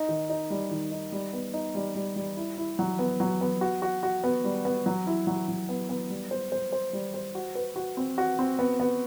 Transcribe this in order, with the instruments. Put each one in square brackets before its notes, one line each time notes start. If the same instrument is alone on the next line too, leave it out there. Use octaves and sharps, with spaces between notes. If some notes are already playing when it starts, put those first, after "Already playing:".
Already playing: [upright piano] D#4
D#3
D#4
G3
D#3
D#4
G3
B3
D#4
G3
G3
G3
E4
E4
F#3
B3
F#3
B3
F#4
F#4
F#4
B3
G3
B3
F#3
E4
F#3
F#3
B3
B3
G3
C5
C5
C5
G3
C5
F#4
B4
F#4
C4
F#4
C4
B3
B3